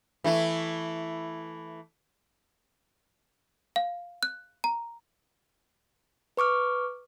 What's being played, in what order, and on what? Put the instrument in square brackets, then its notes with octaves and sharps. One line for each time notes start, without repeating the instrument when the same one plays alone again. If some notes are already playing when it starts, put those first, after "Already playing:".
[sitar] E3 A3 E4
[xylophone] F5
F#6
A#5
[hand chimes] B4 C#6 D6 F6